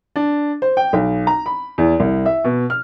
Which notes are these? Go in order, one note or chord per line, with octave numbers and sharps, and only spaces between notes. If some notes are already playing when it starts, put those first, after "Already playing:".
D4
C5
G5
B1
A#5
B5
E2
C2
E5
B2
F6